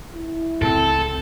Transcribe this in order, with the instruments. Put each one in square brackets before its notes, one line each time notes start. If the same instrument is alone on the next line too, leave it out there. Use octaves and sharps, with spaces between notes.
[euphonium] E4
[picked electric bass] C#2 A2 C3 [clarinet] C4 [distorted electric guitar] A4